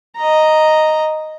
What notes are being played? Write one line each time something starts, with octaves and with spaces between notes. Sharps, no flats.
D#5 A#5